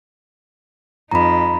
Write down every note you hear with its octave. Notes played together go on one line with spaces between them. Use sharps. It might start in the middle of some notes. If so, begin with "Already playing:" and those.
F2 D#4 A#5 B5